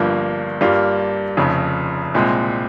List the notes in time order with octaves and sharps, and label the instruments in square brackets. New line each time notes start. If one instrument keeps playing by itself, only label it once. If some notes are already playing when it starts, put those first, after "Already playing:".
Already playing: [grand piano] G1 G2 F3 A#3
G2 G3 A#3 F4
F1 F2 C#3
C2 A#2 G#3 C4